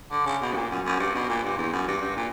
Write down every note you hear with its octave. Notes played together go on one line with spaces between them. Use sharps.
D3
C#3
B2
G2
A#2
F#2
F#2
G2
B2
A#2
G2
E2
F#2
G2
G2
A#2